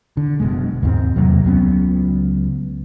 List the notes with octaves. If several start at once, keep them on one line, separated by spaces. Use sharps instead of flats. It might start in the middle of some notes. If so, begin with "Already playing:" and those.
D3
F#1 B2 G#3
D#2 G#2 C4
E2 C3 F#3 A#3
C#2 F#3 B3 C#4